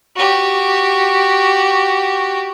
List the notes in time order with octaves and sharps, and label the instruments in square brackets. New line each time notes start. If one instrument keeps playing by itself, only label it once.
[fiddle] F#4 G4